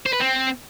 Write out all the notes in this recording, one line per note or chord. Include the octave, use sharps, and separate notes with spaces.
C5
B4
C4